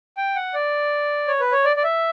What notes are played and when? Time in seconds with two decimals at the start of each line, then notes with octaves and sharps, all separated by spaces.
0.17 G5
0.36 F#5
0.54 D5
1.28 C#5
1.40 B4
1.52 C#5
1.65 D5
1.76 D5
1.84 E5